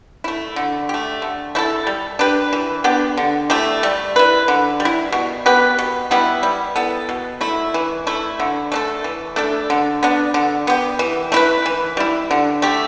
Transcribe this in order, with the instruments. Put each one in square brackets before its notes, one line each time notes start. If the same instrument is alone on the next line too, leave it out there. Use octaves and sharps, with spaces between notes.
[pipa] A3 E4
D3
A3 G4
D3
A3 E4 A4
G3
D4 G4 B4
E3
B3 D4 G4
D3
A3 E4 G4
G3
E4 B4
D3
G3
E4
B2
B3 G4 B4
B2
G3 B3 E4
G3
B3 E4 A4
B2
A3 E4
E3
A3 E4
D3
A3 D4 A4
E3
A3 D4 A4
D3
B3 D4
D3
B3 G4
E3
A3 E4 B4
E3
G3 E4
D3
A3 G4